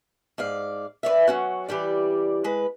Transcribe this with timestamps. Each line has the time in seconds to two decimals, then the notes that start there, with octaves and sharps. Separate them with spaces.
0.38 G#2 D5 F5
1.03 B4 C#5 D5 E5
1.27 F#3 C#4 F#4
1.68 E3 G3 G4 D5
2.44 G#3 B4